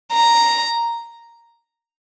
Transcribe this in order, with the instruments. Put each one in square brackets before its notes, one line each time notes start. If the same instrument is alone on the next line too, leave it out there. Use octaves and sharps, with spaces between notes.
[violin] A#5